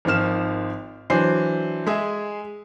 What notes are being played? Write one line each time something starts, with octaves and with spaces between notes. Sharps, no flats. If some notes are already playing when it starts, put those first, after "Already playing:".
G#1 D#3 F3 F6 E7
E3 F#3 D4 C5 C7
G#3 G#4 E5